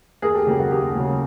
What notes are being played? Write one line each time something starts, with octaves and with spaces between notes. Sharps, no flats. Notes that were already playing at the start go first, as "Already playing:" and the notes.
D#2 G#4 A#4
G4 A4
C#3 F#3 A#3 G4
F#4
D#2 G4
C#3 F#3 A#3